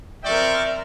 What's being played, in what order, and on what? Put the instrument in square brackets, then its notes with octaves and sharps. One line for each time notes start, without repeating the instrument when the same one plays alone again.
[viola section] F3 C4 A#4 [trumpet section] D5 G5 C#6 [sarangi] E5